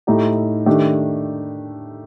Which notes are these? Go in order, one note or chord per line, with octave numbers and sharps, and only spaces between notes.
A2 A3 D#4 G4
D#3 A3 D4 G4